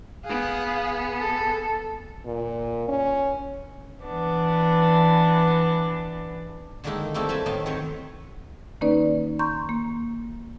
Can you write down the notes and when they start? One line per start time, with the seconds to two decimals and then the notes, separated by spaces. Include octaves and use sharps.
0.25 B3 G#4 F5 F#6
1.19 A4
2.26 A#2
2.88 C#4
4.04 E3 B3 D4
6.84 D3 D#3 G#3 A#3 D#4 E4
7.14 G3 A3 A#3 C4 E4
7.29 F#3 C4 B4 G#5 A5 B5
7.46 A2 D#3 B3 D#5 F5 A5
7.66 D#3 C4 F#4 A#4 B4 C#5
8.81 D#3 A#3 C#4 D#4 B4 D5
9.39 A#5 C6 C#6 G6
9.69 A#3